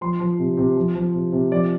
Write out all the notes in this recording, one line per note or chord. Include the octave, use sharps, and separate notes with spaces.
F3 C6
F3
C3
C3
F3
F3
C3
C3
F3 D5